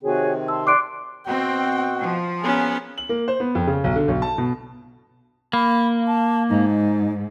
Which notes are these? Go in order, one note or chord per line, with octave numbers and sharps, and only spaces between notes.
C3 D#3 C4 F#4 G#4 C#5
A5 C6 E6
D5 C6 D6 F#6 D7
B2 C4 F#4 G5
F3
A#2 F#3 B3 C#4 G#4 A#4
F#7
A#3
C5
B3
F2
C#3
B1
D3
B1
A5
B2
A#3 B5
A5
G#2 D#4